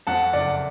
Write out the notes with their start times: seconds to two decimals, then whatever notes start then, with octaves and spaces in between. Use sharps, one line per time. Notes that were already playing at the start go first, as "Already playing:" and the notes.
0.07 F2 F#5 A5
0.33 F#1 D5 F#5